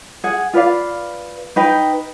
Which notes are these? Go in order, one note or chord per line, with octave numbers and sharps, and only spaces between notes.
G#4 F#5
F4 B4 D5 F5
D#4 B4 G5